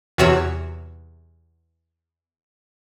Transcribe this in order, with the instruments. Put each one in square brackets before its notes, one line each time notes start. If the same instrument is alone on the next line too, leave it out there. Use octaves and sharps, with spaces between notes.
[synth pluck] E2 C3 F#4 C#5 C#6 E6